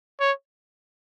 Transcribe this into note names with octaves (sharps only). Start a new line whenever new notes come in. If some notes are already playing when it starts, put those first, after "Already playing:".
C#5